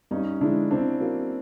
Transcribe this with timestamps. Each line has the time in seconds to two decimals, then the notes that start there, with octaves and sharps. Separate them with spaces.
0.11 G2 C#4 D#4
0.41 D3 F3 G#3 D4 E4
0.71 C#3 C4 D4
1.01 F#3 A#3